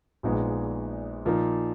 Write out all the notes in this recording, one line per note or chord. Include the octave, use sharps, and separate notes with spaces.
A#1 A#2 G#3 B3 D#4
A#2 F3 A#3 D#4